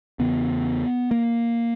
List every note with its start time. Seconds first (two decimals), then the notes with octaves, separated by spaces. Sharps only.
0.19 E2 C#3 B3
1.11 A#3